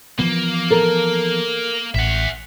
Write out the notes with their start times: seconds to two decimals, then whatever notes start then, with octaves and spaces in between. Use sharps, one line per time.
0.19 E3 F3 A#3 B3
0.70 A4 A#4
1.95 A1 E5 F#5